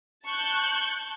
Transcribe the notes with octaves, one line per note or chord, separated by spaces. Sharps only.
A5 C#6 F#6 G6